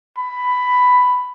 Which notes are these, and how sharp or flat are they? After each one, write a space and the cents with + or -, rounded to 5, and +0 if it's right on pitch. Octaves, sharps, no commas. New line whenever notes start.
B5 +10